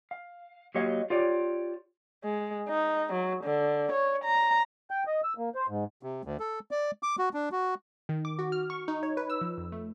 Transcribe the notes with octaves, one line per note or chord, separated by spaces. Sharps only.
F5
F#3 A#3 G4 C#5 D#5 F5
F4 G4 C#5 D5
G#3
D#4
F#3
D3
C#5
A#5
G5
D#5
E6
A#3
C5
G#2
C3
D2
A4
D5
D6
F#4
D4
F#4
D#3
D6
F#4
F6
C#6
D#4
C#5
B4
E6
F3
F2
A3